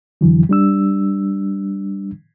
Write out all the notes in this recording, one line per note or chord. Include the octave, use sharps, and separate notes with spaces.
F2 D3 E3 F#3
G3 D4 E6